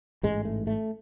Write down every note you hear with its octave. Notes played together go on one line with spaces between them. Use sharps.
A1 G#2 G#3
A3
A3